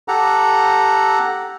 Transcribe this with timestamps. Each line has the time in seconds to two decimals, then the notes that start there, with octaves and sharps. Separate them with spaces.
0.08 G4 A4 F#5 A#5